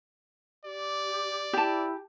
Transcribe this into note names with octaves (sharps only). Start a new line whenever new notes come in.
G4 D5
E4 G4 A5